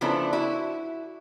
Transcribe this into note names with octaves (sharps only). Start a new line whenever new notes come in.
C#3 F3 B3 D4 E4 A4
E4 F#4